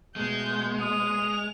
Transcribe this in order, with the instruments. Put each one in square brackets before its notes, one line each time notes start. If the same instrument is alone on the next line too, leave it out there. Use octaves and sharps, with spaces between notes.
[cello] B2 A3 [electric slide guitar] G#3 [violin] G6
[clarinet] D#6 [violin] F7